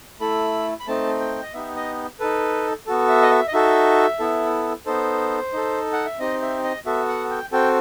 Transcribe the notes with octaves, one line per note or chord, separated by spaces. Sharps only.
A3 E4 A4 B5
B5
A3 C4 D#4 A5
G5
D#5
B3 D#4 G4 E5
D#5
D#4 A4 B4
B3 F#4 A4
E5
D#5
E5
D#5
D#4 F#4 A4 E5
B3 E4 A4
B3 D#4 A4 C5
D#4 A4
F#5
E5
C4 D#4 G4 D#5
E5
D#5
B3 F#4 A4 E5
F#5
G5
C4 F#4 A4 G5